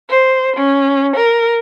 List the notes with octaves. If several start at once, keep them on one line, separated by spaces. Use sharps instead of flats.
C5
C#4
A#4